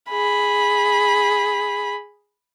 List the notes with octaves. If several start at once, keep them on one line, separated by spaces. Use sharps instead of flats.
G#4 B5